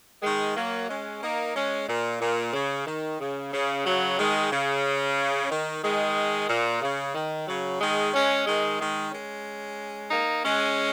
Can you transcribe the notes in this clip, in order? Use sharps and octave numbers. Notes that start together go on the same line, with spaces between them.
D#3 G#3
F#3 A#3
G#3 C#4
A#3 D#4
G#3 C#4
A#2
A#2
C#3
D#3
C#3
C#3
C#3 F#3
D#3 G#3
C#3
D#3
D#3 G#3
A#2
C#3
D#3
C#3 F#3
D#3 G#3
G#3 C#4
D#3 G#3
D#3 G#3
G#3 C#4
A#3 D#4
G#3 C#4